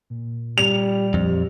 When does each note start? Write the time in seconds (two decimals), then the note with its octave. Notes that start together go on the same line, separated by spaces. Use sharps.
0.10 A#2
0.58 G3 F7
1.14 F2